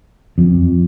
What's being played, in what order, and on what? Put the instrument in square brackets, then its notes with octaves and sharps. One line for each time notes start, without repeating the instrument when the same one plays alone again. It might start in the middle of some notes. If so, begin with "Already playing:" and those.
[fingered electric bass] F2